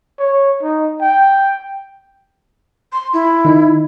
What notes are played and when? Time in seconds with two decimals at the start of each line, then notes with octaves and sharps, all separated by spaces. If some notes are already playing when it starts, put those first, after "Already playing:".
0.19 C#5
0.63 D#4
1.02 G5
2.92 C6
3.13 E4
3.45 D#3 D#4